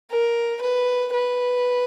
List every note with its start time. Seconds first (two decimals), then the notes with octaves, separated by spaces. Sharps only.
0.11 A#4
0.61 B4
1.13 B4